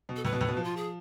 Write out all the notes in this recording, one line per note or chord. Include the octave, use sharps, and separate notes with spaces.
B2
A4
A2 B4
B2
A2
B2
F3
F4
G#4